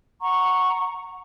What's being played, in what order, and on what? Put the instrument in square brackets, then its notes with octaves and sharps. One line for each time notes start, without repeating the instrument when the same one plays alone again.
[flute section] F#5 A#5 C#6